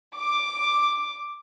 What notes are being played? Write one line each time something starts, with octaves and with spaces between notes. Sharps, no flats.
D6